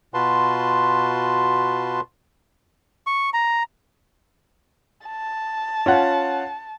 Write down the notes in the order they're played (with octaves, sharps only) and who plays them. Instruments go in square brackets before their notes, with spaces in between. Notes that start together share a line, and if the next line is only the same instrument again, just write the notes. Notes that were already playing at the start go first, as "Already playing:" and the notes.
[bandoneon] B2 F4 F#4 B4 A5 C6
[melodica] C#6
A#5
[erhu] A5
[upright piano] C#4 F4 F#5